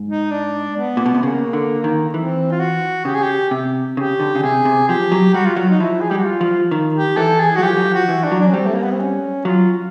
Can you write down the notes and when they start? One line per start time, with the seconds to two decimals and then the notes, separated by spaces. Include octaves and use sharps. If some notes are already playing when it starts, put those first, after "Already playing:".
Already playing: G#2
0.08 D#4
0.31 D4
0.77 B3
0.97 A#2
1.06 B2
1.15 C3
1.23 C#3 A#3
1.53 D3
1.84 D#3
2.14 E3 C4
2.51 F4
2.60 F#4
3.05 C#3 G4
3.14 G#4
3.22 G4
3.51 C3
3.97 C#3 G4
4.20 D3
4.35 C#3
4.43 C3 G#4
4.65 C3
4.88 F3 G4
5.12 F#3
5.34 G3 F#4
5.46 F4
5.56 F#3 F#4
5.69 D#4
5.80 F3 E4
6.01 G#4
6.09 G3 G4
6.18 F#4
6.25 F4
6.41 F3
6.71 D#3
6.94 G4
7.17 E3 A4
7.40 G#4
7.55 F#3 F#4
7.62 F3 G4
7.77 F#3
7.86 F3
7.94 F#4
8.09 E3
8.24 D4
8.31 F#3
8.40 D4
8.47 C#4
8.54 G3 C4
8.66 A3
8.75 A#3
8.83 B3
8.91 C4
9.00 C#4
9.45 F#3 F4